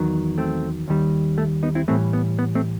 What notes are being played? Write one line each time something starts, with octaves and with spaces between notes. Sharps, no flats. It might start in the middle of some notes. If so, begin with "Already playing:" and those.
Already playing: E2 D#3 F#3
A3 C4
D#2 D#3 G3
A3
B3 D#4
C4 E4
A2 E3 G3 A3 C4
B3
B3
A3 C4